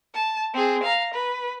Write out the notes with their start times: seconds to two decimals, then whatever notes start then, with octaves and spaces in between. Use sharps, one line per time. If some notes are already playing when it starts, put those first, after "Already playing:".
0.14 A5
0.54 C4 G#4
0.83 F5 A#5
1.14 B4